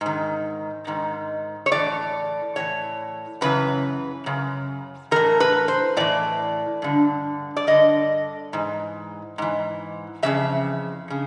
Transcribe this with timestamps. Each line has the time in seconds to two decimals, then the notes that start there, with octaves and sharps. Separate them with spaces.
0.01 G#2 D#3
0.87 G#2 D#3
1.66 C#5
1.72 A2 E3 D5
2.56 A2 E3 C#5
3.41 F#2 C#3 E3 B4
4.26 F#2 C#3
5.11 A2 E3 A#4
5.40 B4
5.68 C5
5.97 A2 E3 D5
6.82 G2 D3
7.57 D5
7.67 G2 D3 D#5
8.53 G#2 E3
9.38 G#2 E3
10.23 F2 C#3 E3 E5
11.10 C#3